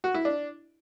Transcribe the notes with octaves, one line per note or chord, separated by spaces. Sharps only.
F#4
E4
D4